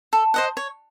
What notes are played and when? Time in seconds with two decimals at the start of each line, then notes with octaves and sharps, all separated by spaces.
0.13 A4
0.34 C5 D#5 F#5
0.57 C#5